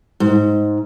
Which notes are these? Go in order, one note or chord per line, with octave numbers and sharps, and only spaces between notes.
G#2